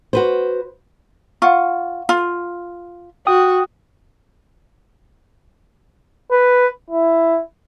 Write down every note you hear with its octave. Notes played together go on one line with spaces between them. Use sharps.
F#4 B4 C5
F4 F5 F#5 C#6
F4
F#4 G5 D#6
B4
E4